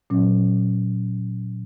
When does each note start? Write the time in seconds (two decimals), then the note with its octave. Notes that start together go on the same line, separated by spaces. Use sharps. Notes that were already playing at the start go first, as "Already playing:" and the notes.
0.10 A#2 F#3 C#4